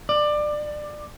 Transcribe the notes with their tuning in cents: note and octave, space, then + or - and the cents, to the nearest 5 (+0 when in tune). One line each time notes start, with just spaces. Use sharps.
D5 +20